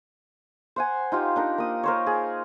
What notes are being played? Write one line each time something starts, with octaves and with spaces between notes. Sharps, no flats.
C5 F#5 G#5
D#4 F4 G4
D4 D#4 A#4
A#3 D#6
A#4 C5 C#5
G#4